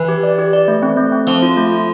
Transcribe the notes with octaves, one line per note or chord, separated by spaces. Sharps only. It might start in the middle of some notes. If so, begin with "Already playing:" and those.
Already playing: E3 B4
G4
D5
G4
D5
A3
C4
A3
C4
F3 C4
F4
A3
F4